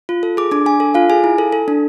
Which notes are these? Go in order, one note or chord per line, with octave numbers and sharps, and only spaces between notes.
F4
A4
G#4 D6
D4 D6
D4 G#5
A4
F4 F5
G#4 G#5
E4
A4
A4
D4